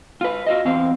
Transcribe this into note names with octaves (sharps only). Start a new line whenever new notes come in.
F4 B4
F4 F#4 D#5
E2 C4 F5